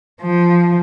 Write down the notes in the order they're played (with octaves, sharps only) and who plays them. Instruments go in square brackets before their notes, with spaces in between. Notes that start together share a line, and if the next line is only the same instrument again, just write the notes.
[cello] F3